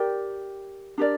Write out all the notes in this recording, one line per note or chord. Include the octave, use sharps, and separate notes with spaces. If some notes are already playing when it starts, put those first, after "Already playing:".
Already playing: G4 A#4 D5 G5
D4 G4 A#4 D5